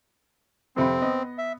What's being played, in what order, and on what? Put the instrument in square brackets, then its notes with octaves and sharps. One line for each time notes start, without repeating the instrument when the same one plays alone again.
[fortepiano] F2 C3 B5 [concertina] C4
[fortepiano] B3 D#5
[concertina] E5